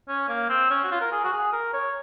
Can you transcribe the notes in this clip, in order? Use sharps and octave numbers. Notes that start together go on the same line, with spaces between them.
C#4
A#3
C4
C#4
F#4
F4
A#4
G#4
F#4
G#4
A#4
C#5